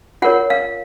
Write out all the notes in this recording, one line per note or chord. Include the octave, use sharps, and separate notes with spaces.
F4 A#4 C#5 F#5
F5